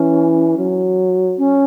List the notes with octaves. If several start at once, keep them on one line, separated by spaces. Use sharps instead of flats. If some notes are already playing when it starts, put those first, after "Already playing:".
Already playing: E3 C#4
F#3
C#4